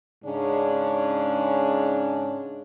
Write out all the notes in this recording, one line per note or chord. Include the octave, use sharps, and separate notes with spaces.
G#2 C#3 G#3 C#4 D4